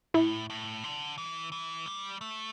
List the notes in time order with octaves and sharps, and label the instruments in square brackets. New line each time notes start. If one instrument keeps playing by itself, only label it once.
[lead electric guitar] A2 [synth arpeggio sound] E4
[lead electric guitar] A2
D3
E3
E3
G3
A3